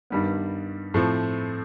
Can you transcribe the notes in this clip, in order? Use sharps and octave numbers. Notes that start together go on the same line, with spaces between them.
G2 D#3 G3 B3
A2 F3 A3 C4